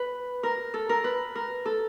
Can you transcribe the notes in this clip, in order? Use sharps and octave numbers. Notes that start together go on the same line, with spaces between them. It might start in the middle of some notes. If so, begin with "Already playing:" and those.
Already playing: B4
A#4
A4
A#4
B4
A#4
A4